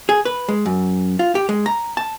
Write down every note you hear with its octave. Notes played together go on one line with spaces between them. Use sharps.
G#4
B4
G#3
F#2
F4
G4
G#3
A#5
A5